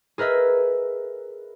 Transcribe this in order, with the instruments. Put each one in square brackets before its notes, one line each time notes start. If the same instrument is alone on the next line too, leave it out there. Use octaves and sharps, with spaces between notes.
[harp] G#4 A#4 B4 D#5 E5